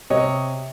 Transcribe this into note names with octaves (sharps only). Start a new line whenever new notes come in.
C3 C#5 D#5